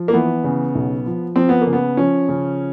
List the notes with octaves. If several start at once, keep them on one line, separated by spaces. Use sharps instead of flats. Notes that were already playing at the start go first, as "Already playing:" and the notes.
Already playing: F3
A#3
E3 B3
C#3
B1
F3
F3 C4
B3
A#3
C#3
B3
F3 C#4
C#3